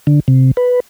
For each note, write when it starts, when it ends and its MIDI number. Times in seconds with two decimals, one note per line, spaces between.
0.07 0.20 50
0.28 0.51 48
0.57 0.80 71